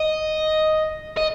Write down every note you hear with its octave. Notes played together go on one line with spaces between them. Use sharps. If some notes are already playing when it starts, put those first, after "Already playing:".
Already playing: D#5
D#5